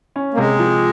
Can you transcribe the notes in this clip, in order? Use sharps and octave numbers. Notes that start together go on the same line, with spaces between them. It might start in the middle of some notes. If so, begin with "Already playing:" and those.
C#4
A#3
C3 G#3
F3